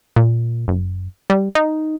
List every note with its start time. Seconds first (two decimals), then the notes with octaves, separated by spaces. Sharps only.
0.16 A#2
0.68 F#1
1.30 G3
1.55 D#4